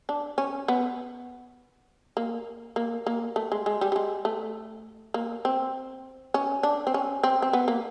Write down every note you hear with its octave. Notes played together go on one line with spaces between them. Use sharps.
D4
C#4
B3
A#3
A#3
A#3
A3
G#3
G#3
G3
G3
G#3
A3
A#3
C4
C#4
D4
C4
C#4
C4
C4
B3
A#3